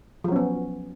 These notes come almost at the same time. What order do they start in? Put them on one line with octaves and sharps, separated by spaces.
F3 F#3 C#4 B3